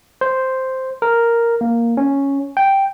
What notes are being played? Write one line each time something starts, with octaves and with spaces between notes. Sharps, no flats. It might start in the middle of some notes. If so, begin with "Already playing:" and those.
C5
A#4
A#3
C#4
G5